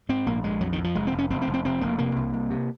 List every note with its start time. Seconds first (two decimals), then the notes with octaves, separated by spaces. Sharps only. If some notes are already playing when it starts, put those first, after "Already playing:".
0.09 G#2 C4
0.26 A#1 A#3
0.44 A#1 G#3
0.60 F2 F#3
0.73 D#3
0.78 F2
0.84 F3
0.95 F1 G#3
1.07 C4
1.12 F1
1.18 C#4
1.30 F1 C4
1.42 C4
1.47 F1
1.54 C4
1.65 F1 C4
1.81 F1 A#3
1.99 C3 A#3
2.16 C2
2.33 C2
2.50 C3